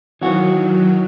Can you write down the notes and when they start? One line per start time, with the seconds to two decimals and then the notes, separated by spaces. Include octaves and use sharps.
0.21 D#3 E3 F#3 F#4